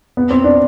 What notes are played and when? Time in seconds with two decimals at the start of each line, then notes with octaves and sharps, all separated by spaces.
0.17 B3
0.30 C4
0.44 D4